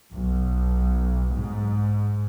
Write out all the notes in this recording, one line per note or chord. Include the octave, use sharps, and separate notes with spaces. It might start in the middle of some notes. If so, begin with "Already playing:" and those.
B1
G#2